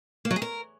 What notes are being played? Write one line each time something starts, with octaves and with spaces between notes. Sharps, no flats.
A#3
F#3
G#4
A#4